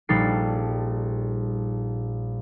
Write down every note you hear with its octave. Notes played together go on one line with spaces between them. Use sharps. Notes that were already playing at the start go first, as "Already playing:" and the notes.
A#1 G3 D#4 A4 C7